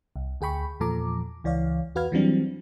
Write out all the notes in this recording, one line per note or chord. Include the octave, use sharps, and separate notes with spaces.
C2
D2 G#4 G5 B5 C#6
E2 A#2 F3 A4 A#5 D6
C#2 E3 C#5 D5 F5
E2 F#4 B4 F5 F6 G#6
E3 F#3 G3 C4 D4